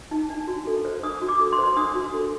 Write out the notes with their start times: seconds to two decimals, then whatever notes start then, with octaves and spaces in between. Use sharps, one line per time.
0.11 D#4
0.30 D4
0.48 F#4
0.67 A4
0.85 C5
1.03 D4 D#6
1.22 F#4
1.28 D6
1.40 A4
1.52 C6
1.59 C5
1.76 D4 D#6
1.95 F#4
2.14 A4